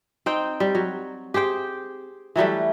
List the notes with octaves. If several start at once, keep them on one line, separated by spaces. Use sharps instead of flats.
C4 D#4 G5
G3
F#3
G4 G#4 C5 G5
E3 F#3 G3 A3